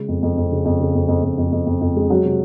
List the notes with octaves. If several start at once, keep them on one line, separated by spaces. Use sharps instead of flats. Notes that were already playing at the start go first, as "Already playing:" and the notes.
Already playing: C#3 G#3
F2
F2
F2
C#3
F2
C#3
F2
F2
F2
F2
F2
F2
F2
G#3
F#3
C3